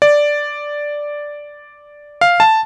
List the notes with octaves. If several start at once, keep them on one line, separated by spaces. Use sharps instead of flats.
D5
F5
A5